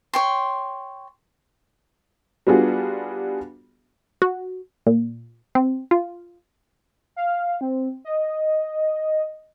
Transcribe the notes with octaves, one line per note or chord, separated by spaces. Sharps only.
C#5 G5 C6
G3 B3 D4 F4 F#4 G#4
F#4
A#2
C4
F4
F5
C4
D#5